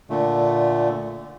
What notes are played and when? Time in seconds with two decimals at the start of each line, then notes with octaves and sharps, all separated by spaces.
0.10 A#2 D3 A3